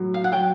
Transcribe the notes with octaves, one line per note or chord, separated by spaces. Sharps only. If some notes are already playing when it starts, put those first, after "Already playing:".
Already playing: A2 F#3
F5
F#5
F#3 G5